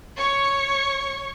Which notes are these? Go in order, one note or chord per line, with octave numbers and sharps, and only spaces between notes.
C#5 C#6